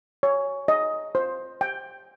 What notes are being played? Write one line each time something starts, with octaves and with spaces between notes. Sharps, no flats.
C#5
D#5
C5
G5